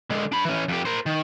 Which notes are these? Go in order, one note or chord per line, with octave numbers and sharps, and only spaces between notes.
D3 G#3
D4 B5
E3 C#4
F2 G4
A#4 C5
D#3